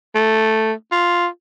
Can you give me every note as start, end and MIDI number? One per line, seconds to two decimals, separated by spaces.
0.15 0.72 57
0.92 1.26 65